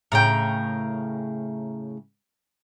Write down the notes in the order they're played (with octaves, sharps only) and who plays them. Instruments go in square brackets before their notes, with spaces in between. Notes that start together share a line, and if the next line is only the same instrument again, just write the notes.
[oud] A2 C#3 [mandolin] A#4 G5